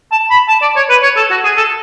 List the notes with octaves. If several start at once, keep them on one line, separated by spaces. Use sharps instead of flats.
A5
B5
A5
D5
C#5
B4
C#5
A4
F#4
G#4
A4